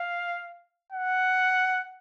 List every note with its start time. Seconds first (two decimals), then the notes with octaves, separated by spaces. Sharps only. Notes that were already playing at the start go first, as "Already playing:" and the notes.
Already playing: F5
0.93 F#5